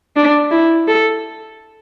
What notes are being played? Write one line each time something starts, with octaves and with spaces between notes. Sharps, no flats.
D4
E4
A4